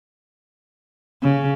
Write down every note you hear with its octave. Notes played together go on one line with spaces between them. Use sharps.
C#3